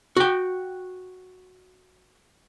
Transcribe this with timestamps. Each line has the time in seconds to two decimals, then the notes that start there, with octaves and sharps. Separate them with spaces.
0.17 F#4 G5